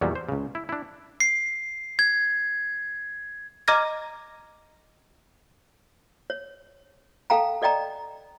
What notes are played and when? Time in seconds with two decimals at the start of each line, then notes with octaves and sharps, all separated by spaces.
0.01 E2 A#2 D#3 F#3 G3 A5
0.15 C5
0.29 C#2 C#3
0.55 E4
0.69 D4 E4
1.20 C7
1.99 G#6
3.68 D#5 A#5 D6 F6 G#6 A#6
6.30 C#5
7.30 A4 F5 G5 A5 A#5
7.62 A4 D5 D#5 G5 A#5